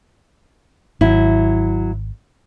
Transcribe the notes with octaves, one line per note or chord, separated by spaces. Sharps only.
G#1 F#3 E4